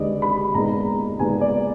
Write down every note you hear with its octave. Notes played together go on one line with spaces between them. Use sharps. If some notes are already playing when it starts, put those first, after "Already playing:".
Already playing: D#2 D3 G#3 D4 B4 D5 D#5
B5
A#2 G#3 B3 D#4 A#5
A#2 G#3 B3 D#4 G#5
D5